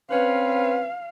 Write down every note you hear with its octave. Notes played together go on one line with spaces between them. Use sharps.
C4 C#4 B4 F5